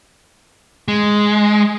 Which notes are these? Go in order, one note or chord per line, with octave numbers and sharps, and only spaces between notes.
G#3